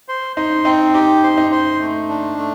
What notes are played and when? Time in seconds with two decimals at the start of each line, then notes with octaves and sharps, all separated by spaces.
0.08 C5
0.36 D#4 C5
0.65 C4 D#4
0.94 D#4 G4
1.23 C5
1.37 D#4
1.52 C5
1.81 A3
2.09 D4
2.38 A3